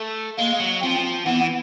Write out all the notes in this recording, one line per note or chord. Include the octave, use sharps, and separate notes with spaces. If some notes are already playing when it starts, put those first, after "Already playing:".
Already playing: A3
G#3 A#3
F#3
F3 C4
E3 B3